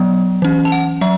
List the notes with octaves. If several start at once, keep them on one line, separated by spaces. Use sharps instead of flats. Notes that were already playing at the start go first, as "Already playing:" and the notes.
Already playing: F#3 B3
E3 C#4
A5
F#5
F#3 E5